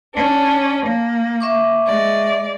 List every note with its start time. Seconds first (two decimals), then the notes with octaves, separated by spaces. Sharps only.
0.14 C#4 D4
0.85 A#3
1.40 E5 C#6 D6
1.86 G#3 D5